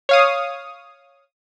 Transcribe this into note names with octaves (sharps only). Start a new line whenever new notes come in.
C#5 F5 D#6